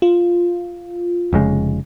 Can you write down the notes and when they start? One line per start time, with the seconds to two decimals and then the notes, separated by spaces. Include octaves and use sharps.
0.02 F4
1.33 F1 C#3 G#3